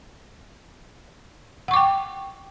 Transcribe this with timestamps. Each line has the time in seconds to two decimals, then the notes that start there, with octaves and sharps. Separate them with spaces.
1.68 F#5
1.71 C#6
1.74 D6
1.76 G5